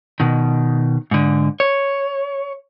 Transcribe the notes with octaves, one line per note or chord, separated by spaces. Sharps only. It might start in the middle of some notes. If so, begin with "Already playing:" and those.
B2 D#3
G#2 D3
C#5